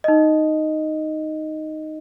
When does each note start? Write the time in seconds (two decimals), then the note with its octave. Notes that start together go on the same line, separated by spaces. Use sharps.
0.04 D#4 D#5